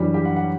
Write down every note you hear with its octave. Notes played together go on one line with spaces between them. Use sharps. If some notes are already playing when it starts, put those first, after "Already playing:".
Already playing: F#2 E3 G3 D4 G4
G4
F#5
F#5